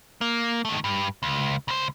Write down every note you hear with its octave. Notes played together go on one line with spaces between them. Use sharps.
A#3
D#3 A3
G2
C#2
C#2 C5